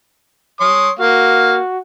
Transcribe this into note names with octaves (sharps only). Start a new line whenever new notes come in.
C#5 C6 D#6
A#3 F#4 F5